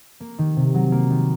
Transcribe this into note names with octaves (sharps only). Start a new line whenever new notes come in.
A#3
D#3
C3
F#3
A#3
D#3